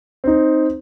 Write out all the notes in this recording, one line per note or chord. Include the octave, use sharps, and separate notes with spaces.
C4 D#4